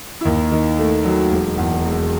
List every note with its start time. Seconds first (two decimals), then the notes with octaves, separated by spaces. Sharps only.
0.21 E4
0.25 D#2 D#4
0.52 D#3
0.78 A3
1.05 F#3
1.31 E1
1.58 E2
1.85 E1